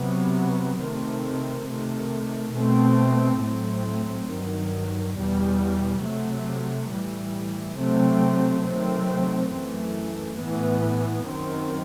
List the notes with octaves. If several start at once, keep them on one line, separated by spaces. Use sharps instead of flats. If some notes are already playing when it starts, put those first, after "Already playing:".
Already playing: C3 F#3 B3
C3 D#3 A3 C4
C3 D#3 A3
B2 A3 C4
A2 F#3 A3 C4
G2 D#3 F#3
E2 B2 G3
C3 F#3 A3
A2 E3 G3
C3 F#3 A3 C4
C3 D#3 F#3 A3 C4
F#2 E3 A3
A2 E3 B3
F#2 D#3 F#3 C4